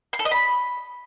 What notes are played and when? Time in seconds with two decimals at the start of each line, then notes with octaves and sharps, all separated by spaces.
0.13 C6
0.19 A4
0.25 D#5
0.31 B5